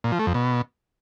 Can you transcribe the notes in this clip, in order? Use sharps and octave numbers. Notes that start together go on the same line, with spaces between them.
A#2
F3
A3
F2
B2